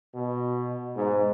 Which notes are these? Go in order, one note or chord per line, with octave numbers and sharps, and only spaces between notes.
B2
G#2